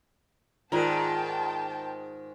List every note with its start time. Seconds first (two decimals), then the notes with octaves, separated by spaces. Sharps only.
0.72 G#2 D#3 F4 A#4 D5 G5 A5 A#5